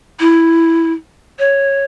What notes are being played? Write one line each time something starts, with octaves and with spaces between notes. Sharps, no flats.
E4
C#5